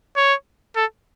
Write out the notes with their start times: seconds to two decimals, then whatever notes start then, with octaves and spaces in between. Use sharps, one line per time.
0.17 C#5
0.76 A4